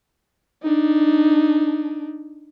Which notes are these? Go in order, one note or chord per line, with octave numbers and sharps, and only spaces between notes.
D4 D#4